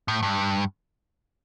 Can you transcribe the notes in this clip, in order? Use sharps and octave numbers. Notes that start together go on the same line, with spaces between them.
A2
G2